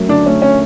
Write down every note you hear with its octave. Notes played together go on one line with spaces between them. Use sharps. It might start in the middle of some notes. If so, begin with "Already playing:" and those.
Already playing: F#2 F#3 A3
D3 D4
A3 C#4
C#4